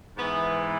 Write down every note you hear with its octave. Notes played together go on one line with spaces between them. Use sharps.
G#2 E3 B3